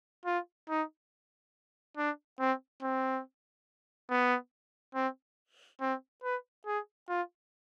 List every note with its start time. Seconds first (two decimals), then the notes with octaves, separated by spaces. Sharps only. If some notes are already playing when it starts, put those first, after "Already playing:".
0.26 F4
0.69 D#4
1.97 D4
2.40 C4
2.82 C4
4.10 B3
4.95 C4
5.81 C4
6.23 B4
6.66 G#4
7.09 F4